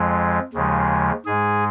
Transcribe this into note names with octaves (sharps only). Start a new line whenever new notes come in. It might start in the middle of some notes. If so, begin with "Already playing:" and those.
Already playing: F2 F3 G#3
D#2 C#3 F3 G#3
G#2 G#3 G#4